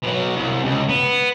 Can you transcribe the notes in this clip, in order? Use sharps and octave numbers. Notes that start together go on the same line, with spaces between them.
B2 F#3
C2
C#2
B3